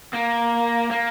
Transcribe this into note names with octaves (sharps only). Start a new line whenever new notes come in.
A#3
A#3